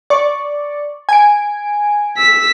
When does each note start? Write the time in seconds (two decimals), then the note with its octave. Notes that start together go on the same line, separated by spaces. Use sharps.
0.10 D5 C#6
1.09 G#5 D7
2.17 E6 B6